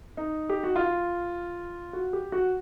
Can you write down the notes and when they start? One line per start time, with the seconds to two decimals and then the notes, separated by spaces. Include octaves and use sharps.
0.17 D#4
0.50 G4
0.64 F#4
0.76 F4
1.93 F#4
2.13 G4
2.32 F#4